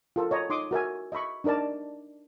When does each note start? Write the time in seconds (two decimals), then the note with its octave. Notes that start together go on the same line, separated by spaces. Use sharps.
0.16 F4 A4 A#4
0.31 C#5 D#5 A#5
0.50 D#4 C6 D6 D#6
0.71 F#4 A#4 E5 G#5
1.12 D#5 E5 B5 C#6
1.44 D4 D#4 A#4 D5 A5